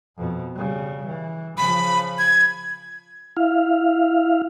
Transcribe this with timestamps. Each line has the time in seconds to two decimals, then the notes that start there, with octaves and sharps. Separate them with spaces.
0.17 F2 B2
0.56 C#3 G3
1.07 E3
1.57 C#3 F3 B5
2.19 G#6
3.37 E4 F5